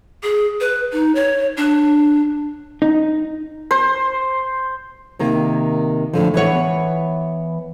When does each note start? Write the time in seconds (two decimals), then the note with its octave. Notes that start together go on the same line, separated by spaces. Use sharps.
0.23 G#4
0.61 B4
0.92 D#4
1.15 C#5
1.57 D4
2.82 D#4
3.71 C5
5.19 C3 D#3 A#3
6.13 A2 D3 F3
6.34 E3 B3 C#5 F#5